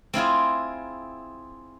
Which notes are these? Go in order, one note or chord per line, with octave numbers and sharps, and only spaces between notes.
C4 E4 F4 G#4